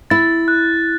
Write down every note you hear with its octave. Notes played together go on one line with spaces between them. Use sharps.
E4 A6
F#6